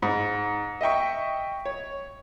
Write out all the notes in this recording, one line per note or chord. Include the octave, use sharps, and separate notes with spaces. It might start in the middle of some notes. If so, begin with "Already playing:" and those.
G#2
D#5 E5 G5 C#6
C#5